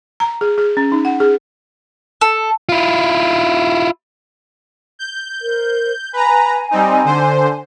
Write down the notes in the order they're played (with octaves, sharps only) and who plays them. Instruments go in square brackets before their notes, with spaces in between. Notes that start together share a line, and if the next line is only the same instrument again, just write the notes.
[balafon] A#5
G#4
G#4
C#4
D#4
F#5
G#4
[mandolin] A4
[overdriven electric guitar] E4 F4
[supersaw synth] G6
[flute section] A#4 C5
[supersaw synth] B4 A#5 [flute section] G#5
[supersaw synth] G3 C4 D#4
D3 C5